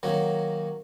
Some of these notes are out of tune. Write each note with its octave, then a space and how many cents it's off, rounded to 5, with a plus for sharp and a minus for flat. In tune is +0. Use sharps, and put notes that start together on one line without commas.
D#3 +0 F#3 +0 A#3 +0